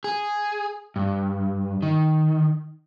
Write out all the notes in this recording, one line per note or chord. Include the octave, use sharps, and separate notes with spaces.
G#4
G2
D#3